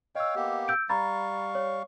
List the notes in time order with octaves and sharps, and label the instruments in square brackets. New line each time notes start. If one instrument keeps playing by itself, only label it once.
[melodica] C#5 F5 G5 [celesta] D#5 E6
[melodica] A#3 B3 G4
[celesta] E6 G6 D7
[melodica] G3 F5 C#6 [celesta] A#5 B5 A6
[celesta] C#5